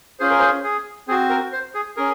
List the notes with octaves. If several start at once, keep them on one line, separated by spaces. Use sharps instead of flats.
C#4 F4 G#4 C5
A#4
C5
G#4
C4 F#4 G#4
A#4
C5
G#4
C#4 G#4 A#4